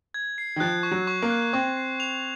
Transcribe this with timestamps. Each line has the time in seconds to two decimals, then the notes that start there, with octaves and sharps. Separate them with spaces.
0.14 G#6
0.38 C7
0.56 D#3
0.60 F3 F#6
0.83 C#6
0.91 F#3
1.07 C#6
1.22 A#3
1.30 F#6
1.53 C4 C#6
1.77 C7
2.00 F7